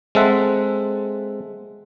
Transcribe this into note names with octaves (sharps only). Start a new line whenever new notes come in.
G#3 C4 A4 E5 F#5